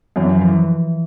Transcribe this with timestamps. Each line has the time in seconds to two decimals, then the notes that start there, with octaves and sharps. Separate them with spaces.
0.16 F#2 E3
0.29 F3
0.41 E3